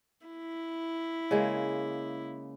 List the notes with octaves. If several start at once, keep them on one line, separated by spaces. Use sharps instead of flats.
E4
C#3 G#3 A#3